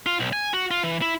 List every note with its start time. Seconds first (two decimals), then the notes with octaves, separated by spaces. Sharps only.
0.06 F4
0.20 B1
0.33 G#5
0.54 F#4
0.71 F4
0.83 E3
1.02 E4